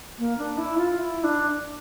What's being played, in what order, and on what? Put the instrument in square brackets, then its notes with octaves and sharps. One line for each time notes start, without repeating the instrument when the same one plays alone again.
[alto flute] A#3
D4
E4
F4
E4
D4